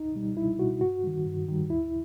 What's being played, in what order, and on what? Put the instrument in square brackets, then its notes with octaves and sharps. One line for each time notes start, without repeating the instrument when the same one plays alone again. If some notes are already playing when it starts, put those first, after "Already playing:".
Already playing: [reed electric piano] C#2 D#4
B2 G3
C#2 E4
B2 G3 F#4
G2 F#4
D#3 G3
G2
D#3 G3
D2 E4